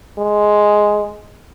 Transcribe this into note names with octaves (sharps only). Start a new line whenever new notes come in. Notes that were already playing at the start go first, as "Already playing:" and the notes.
G#3